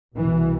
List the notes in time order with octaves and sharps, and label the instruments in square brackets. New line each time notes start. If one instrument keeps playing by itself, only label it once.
[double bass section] C2 B2 E3